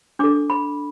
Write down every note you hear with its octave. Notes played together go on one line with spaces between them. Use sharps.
D4 A4 D6
B5